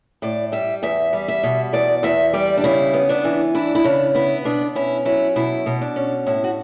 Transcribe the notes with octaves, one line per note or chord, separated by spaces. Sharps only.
A2 D5
G3 E5
E2 E5
G3
E5
B2
E2 D5
E2 E5
G3 D5
D4
C#3 E4
B3
D4
E3
D4 E4
E4
C#3 D4
B3 E4
B2 D4
C#4 E4
F#3 E4
B2 E4
B2
D4
C#4
A2 E4
F#4